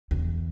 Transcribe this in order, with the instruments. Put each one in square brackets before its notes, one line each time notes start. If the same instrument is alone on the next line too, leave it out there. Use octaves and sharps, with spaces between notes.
[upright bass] E2